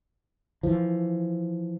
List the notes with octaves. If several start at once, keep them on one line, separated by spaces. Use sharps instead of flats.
E3 F3